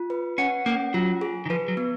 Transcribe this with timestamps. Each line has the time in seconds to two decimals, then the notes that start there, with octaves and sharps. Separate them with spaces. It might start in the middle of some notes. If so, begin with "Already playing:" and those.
Already playing: F4
0.10 B4
0.38 C#4 F#5
0.66 A#3 C#4
0.94 F#3 F4
1.21 G#4
1.46 D#3
1.50 F3 B4
1.68 F#3
1.77 B3